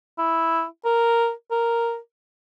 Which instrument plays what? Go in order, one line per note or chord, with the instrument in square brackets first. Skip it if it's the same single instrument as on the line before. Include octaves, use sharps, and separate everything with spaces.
[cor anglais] E4
A#4
A#4